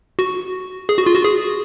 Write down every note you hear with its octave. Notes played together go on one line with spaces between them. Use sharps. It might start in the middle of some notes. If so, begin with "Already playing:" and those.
F#4
G#4
F#4
F4
F#4
G#4